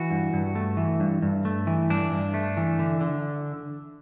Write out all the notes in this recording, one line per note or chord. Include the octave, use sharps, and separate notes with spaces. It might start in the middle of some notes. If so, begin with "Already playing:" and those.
Already playing: E3 F#4
G2
G2
A3
E3
G2
G2
A3
E3
G2 D4
G2
A3
E3
D3
D3